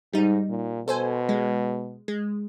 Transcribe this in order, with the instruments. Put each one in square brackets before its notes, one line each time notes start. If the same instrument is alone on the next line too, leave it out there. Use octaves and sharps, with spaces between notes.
[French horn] G#2 [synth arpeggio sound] G3 D#4
[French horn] A#2
[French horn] B2 [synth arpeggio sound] A4 C5 G#5
[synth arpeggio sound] G#3
G#3